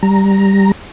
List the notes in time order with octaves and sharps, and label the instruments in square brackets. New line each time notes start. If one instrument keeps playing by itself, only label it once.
[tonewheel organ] G3 A#5